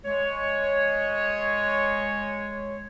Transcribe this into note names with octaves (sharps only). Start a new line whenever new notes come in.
G#3 C#5